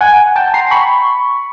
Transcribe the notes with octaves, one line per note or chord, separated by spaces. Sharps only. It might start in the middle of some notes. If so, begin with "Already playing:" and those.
F#5 G#5
G5 A5
A#5 C6
B5 C#6